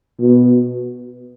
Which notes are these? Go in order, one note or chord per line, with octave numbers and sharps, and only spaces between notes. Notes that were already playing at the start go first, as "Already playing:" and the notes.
B2